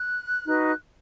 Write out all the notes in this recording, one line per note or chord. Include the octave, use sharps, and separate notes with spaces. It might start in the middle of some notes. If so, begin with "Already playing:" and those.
Already playing: F#6
D#4 F#4 B4